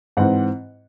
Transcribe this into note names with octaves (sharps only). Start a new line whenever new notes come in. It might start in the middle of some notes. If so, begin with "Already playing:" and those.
G#2 E3 C4 F#5